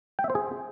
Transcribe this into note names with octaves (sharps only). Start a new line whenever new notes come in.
G5
E5
C5
G#4